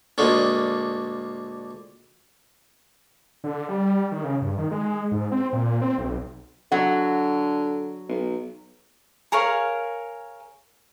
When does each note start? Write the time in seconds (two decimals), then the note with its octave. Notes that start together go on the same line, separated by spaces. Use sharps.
0.18 D2 A#2 D3 G#3
3.44 D3
3.69 G3
4.12 D#3
4.24 C#3
4.42 G2
4.58 D#3
4.71 G#3
5.12 G#2
5.32 C4
5.53 A#2
5.82 C4
5.98 B1
6.72 D3 F#3 F#5
8.09 B1
9.32 G#4 A#4 C#5 F5